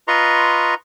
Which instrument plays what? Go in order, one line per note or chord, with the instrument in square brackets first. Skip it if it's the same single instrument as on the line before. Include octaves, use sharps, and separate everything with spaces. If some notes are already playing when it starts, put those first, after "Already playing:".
[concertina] F4 B4 D#5 A#5 C6 C#6